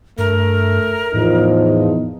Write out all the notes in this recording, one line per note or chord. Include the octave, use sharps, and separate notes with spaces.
G2 A3 A#4
E2 A2 F3 D#4